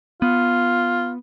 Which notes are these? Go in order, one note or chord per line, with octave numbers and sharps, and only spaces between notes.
B3 F4